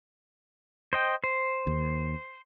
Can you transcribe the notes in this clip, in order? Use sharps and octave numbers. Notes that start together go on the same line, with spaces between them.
C5 D#5 G5
C5
D#2